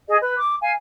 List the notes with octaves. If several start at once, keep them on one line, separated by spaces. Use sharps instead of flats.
G#4 D#5
B4
D6
F5 G#5